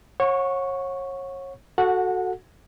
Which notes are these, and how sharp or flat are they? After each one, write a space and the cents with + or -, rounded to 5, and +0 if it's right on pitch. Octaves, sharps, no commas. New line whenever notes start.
C#5 -30 F#5 -30 C#6 +0
F#4 +0 A4 +0 F#5 -25